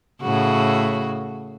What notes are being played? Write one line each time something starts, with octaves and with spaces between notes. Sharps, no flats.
A2 C#3 F#4